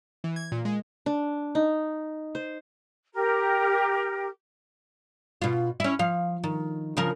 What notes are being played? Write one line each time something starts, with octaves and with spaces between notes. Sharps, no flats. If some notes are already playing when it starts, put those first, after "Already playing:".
E3
G#6
A#2
G#3
D4
D#4
C5
G4 A#4
B2 F4
C#4 E4
F3 F5
D#3
C#3 F3 A#4